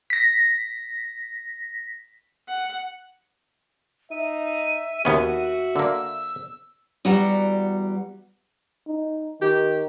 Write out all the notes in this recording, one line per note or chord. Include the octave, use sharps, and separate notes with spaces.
A#6 B6
F#5
D#4 E5 D#7
D#2 B3 C#4 F#4 E5
D3 A#3 E6
E2 G3 F#4 D5 F#5 A#5
D#4
D#3 G4